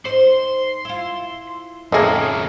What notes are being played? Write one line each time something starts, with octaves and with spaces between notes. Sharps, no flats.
D#4 C5 C6
E4 F4
F2 A2 C#3 A#3 G#4 D#5